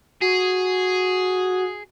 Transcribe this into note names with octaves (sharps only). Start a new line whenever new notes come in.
F#4 G#4